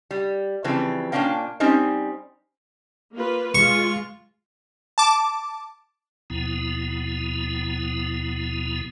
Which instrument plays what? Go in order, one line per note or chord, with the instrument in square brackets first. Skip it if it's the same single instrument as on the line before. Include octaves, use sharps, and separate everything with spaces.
[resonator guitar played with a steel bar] G3
C#3 E3 F3 G3 C4
A#2 A#3 C#4 D4 F5 G5
G3 C4 C#4 D#4 C5
[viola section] A#3 F4 B4
[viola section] G#3 F4 [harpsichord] C#6
[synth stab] A5 D6
[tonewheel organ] D#2 B2 F3 B3 E4